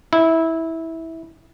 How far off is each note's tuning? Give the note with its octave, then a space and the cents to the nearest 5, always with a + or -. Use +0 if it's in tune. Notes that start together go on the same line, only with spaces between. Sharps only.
E4 -15